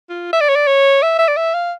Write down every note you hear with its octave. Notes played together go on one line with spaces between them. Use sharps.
F4
E5
D5
C#5
D5
C#5
E5
E5
D5
E5
F5